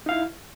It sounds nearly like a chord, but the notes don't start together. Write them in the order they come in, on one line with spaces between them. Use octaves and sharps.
D#4 F5 E4